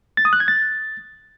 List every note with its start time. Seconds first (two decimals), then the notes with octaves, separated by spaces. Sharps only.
0.17 A6
0.25 D#6
0.33 F#6
0.40 G#6
0.48 A6